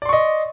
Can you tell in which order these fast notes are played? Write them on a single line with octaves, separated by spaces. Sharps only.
D5 C6 C#6 D#5